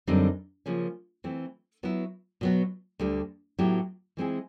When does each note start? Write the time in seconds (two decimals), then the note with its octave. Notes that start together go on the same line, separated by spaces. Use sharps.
0.07 F#2 D3 G3 C4 D#4
0.66 C#3 F3 A#3 C#4
1.24 E3 A3 C4
1.83 F#3 B3 E4
2.41 B2 F#3 B3
3.00 D2 D3 G3
3.59 A2 F#3 B3 E4 G4
4.17 E3 G#3 C4 E4 G#4